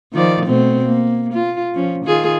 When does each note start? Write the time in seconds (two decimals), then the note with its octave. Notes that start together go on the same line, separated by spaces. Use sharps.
0.13 D#3 F3 D5
0.46 B2 A3 C4
0.85 A#3
1.33 F4
1.74 F3 C#4
2.05 D#3 F4 G#4